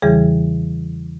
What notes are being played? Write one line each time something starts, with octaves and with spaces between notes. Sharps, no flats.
E2 C#3 E3 G3 G#4